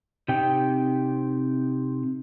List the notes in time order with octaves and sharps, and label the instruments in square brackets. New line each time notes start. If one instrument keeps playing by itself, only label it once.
[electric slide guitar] C3 D#4 G4 G5